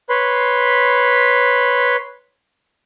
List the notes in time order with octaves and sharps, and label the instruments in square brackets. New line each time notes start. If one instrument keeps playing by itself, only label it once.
[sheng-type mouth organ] B4 C#5 B5 C6